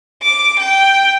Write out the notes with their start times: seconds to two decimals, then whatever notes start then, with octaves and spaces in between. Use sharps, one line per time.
0.23 D6
0.59 G5